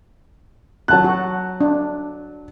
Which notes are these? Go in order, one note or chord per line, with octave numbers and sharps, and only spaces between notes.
F#3 A5 F#6
F#4
D4